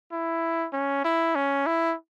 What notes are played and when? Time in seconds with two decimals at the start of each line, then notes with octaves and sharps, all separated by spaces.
0.12 E4
0.73 C#4
1.05 E4
1.35 C#4
1.67 E4